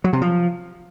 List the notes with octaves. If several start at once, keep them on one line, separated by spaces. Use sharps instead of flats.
F#3
C3
F3